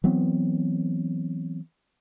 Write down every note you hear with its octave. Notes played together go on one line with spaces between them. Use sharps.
E3 F#3 B3 C4